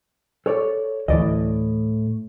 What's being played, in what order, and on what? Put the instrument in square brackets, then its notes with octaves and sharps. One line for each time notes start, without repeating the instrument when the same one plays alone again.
[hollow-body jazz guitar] A4 C#5 D5
[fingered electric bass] D2 E3 [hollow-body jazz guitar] A2 D5 D#5